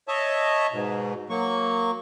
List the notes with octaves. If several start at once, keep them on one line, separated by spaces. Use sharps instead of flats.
C#5 D#5 E5 A5
G#2 B2
F#3 A#3 C#6